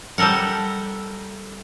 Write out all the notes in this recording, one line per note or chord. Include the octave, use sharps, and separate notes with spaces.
G3 G4 A4 A#4 F#5